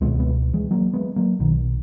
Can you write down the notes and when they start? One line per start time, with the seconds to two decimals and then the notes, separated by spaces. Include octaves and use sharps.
0.01 C#2 B2 G#3 B3
0.19 G#3 B3
0.53 E3 G#3
0.71 F#3 A#3
0.94 G#3 B3
1.16 F#3 A#3
1.39 B1 B2 D#3